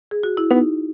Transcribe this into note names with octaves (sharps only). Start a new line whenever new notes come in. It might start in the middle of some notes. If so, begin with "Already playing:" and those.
G#4
F#4
E4
B3 D#4